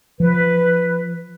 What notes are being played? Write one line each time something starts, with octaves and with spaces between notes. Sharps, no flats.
F3 B4